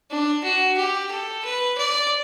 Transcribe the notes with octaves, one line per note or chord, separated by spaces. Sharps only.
D4
F#4
G4
A4
B4
D5